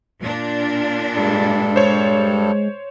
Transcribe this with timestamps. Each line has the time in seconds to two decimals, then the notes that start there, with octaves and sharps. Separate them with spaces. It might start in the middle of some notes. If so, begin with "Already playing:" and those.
0.21 A#2 D4
1.16 G2 G3 G#3 A4
1.76 C5 C#5